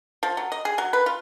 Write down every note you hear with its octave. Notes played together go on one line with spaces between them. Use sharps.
F3
F#3
D#5
G#4
F#3
B4
F4